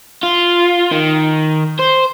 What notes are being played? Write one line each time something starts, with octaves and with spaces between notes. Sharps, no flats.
F4
D#3
C5